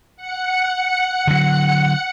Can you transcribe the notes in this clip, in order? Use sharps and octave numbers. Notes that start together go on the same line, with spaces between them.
F#5 C#7
D3 F#3